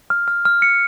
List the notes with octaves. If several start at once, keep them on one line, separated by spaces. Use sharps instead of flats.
F6
F6
F6
C#7